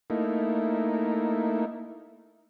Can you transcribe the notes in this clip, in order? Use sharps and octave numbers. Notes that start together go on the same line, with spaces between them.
A3 A#3 D#4 E4